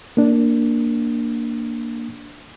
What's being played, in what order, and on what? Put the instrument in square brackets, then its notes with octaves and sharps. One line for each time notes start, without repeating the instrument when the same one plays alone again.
[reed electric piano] A#3 D4